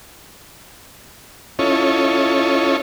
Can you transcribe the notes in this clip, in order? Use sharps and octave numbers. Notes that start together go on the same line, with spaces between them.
C#4 E4 F4 A4 C#5 D#5